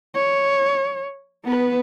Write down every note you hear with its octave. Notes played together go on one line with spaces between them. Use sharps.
C#5
B3 B4